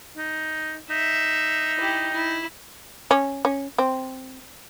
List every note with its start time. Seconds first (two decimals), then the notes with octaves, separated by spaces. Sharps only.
0.17 D#4
0.90 D#4 E5
1.77 E4 G4
2.13 E4
3.11 C#4
3.45 C#4
3.78 C4